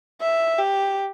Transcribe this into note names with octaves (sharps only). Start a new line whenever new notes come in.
E5
G4